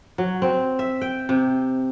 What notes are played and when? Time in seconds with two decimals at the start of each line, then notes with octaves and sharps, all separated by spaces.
0.18 F#3
0.42 C4
0.79 E5
1.01 G5
1.29 C3